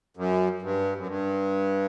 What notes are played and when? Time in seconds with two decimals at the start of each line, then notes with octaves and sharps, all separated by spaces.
0.17 F#2
0.62 G2
0.96 F#2
1.07 G2